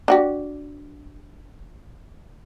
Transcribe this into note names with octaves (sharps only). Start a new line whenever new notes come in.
D4 F#4 G4